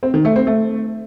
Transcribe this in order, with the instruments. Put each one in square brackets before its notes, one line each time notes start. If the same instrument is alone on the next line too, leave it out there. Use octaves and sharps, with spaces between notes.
[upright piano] C4
D#3
A3
C4
A3